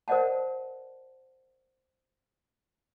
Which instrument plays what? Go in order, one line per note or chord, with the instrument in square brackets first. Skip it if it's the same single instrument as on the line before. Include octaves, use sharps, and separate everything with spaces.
[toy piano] A#4 C5 D5 D#5 F#5 A5